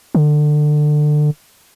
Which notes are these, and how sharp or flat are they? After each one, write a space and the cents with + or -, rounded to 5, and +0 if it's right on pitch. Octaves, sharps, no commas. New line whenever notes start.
D3 +25